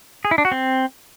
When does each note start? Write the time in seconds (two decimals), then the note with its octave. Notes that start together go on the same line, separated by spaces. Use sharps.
0.25 G#4
0.31 E4
0.38 D4
0.45 F#4
0.52 C4